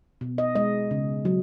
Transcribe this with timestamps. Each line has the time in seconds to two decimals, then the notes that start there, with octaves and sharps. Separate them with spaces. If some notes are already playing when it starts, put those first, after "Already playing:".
0.21 B2
0.38 D#5
0.55 G#3 D#5
0.91 C#3
1.25 F#3